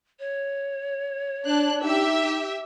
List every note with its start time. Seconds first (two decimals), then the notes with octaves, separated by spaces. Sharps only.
0.19 C#5
1.46 D4 F#6
1.82 D#4 G4 E5